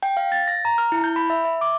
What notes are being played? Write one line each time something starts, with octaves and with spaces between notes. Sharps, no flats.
G5
F5
A6
A#6
A#5
F6
E4
G6
B5
E5
E5
D6